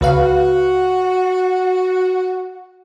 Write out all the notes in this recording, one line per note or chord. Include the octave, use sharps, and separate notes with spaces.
C#2 F#4 B4 F5